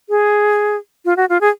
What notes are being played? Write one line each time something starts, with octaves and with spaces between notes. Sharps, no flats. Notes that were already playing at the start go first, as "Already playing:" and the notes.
G#4
F4
F#4
F4
G#4